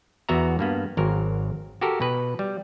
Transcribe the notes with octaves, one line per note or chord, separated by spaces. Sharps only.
E2 B3 F#4 E5 A#5
G2 A#3 B3
G#1 F#3 A#4
F#4 G4 A4 A#4
B2 B4
G3